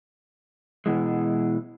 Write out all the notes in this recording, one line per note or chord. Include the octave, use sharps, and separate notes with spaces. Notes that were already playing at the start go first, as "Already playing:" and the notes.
B2 E3 G#3